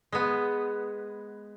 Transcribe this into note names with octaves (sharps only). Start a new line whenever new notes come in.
G#3 B3